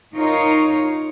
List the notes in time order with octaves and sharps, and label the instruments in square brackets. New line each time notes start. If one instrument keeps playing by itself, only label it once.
[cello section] D#4 F4 A#4 C#5